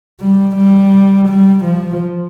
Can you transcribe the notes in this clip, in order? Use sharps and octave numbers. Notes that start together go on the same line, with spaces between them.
G3
G3
G3
F3